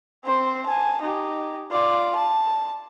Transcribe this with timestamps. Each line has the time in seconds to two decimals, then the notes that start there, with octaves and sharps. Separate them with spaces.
0.25 C4 C5
0.66 G#5 A5
1.02 D#4 G4
1.71 F4 D5
2.15 A5